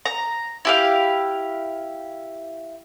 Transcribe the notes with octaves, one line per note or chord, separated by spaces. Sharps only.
A#5
E4 G4 F5